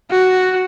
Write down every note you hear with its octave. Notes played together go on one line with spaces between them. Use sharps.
F#4